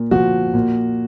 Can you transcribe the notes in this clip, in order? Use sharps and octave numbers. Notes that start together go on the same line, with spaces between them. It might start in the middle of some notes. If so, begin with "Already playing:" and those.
Already playing: A#2
F3 F#4
A#2